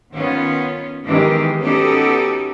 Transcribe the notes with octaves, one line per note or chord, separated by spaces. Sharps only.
D#3 B3 C#4 F4
D#3 E3 G#3 B3 G4 G#4
B3 C#4 D#4 F#4 G4 A4